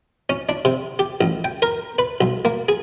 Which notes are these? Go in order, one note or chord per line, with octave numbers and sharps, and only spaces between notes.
C#4
D4
C3
G4
A1
G5
A#4
B4
B1
A#3
G#4